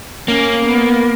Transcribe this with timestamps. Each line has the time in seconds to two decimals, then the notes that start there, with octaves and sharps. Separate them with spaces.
0.28 A#3 C#4
0.66 B3